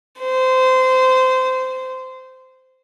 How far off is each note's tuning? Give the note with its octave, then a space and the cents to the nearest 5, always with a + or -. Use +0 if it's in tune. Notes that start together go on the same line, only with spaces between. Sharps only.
C5 -20